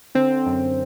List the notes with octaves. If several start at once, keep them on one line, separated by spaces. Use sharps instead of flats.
D3 C4
D3
F#2